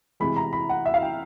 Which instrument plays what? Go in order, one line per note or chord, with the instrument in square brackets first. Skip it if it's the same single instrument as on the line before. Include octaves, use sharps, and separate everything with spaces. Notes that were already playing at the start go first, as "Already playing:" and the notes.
[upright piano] C3 E3 G#3 B5
A#5
B5
F#5
E5
F5
G5